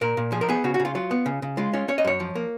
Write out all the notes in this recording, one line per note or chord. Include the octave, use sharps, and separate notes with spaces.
A#2 A#4
A#2
F3 G#4
A#4
B3 G#4
C#3 F#4
F#4
C#3
F4
F#3 F4
B3
C#3
C#3
G#3 F4
C#4 F4
C#4 C#5
D#5
F#2 C#5
F3
A#3